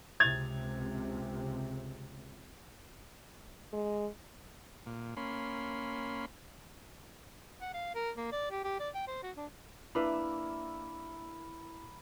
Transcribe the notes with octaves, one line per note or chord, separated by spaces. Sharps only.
C#2 C3 G#6 A6 F7
G#3
A#2
A#3 C#4 B5 C6
F#5
F5
A#4
A#3
D5
G4
G4
D5
G5
C5
F#4
D4
A#3 D4 E4 A#4 B4 E5 B5